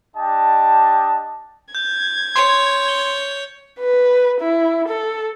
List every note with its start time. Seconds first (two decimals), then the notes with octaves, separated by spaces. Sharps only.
0.16 D4 G4 D#5 A5
1.75 G6 G#6
2.36 C#5 C6
2.89 G7
3.80 B4
4.41 E4
4.89 A4